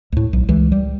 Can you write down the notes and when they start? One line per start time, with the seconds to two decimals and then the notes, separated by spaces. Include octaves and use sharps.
0.12 D2 A2
0.33 B1
0.49 C#2 E3
0.72 G3